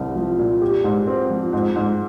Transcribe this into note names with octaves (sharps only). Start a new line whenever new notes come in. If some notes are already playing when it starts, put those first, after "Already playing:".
Already playing: C2 C4
F3
A#2
G4
G#2
C4
F3
G#2
G#2